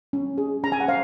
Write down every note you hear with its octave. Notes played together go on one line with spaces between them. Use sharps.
C#4
G#4
C#4 A#5
G#5
F#5
C5 F5